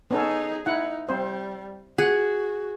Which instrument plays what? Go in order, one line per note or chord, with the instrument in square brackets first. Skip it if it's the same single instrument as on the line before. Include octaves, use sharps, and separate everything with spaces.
[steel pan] B3 C#4 A4 [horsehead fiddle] D#4 G#4
[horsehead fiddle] D#4 [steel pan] E4 F#5
[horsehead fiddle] G3 [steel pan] C4 C5
[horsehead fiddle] F#4 [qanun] G#4 [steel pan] F#5